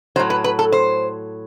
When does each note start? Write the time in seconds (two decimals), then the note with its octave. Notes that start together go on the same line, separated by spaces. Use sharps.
0.16 A2 F#3 C5
0.30 B4
0.44 B4
0.59 A4
0.72 C5